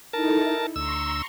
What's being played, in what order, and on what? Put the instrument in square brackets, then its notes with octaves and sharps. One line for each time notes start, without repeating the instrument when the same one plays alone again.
[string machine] D#4 E4 A4 [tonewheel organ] A#4 A5
[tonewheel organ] D2 E6 [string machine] A#5 C6 C#6